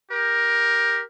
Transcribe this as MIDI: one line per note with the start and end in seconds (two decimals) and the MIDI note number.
0.11 1.02 67
0.11 1.02 70